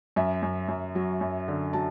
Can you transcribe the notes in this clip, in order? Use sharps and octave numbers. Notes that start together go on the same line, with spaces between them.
F#2 E5
F#2
F#2
F#3
F#2
D3
F#3 A5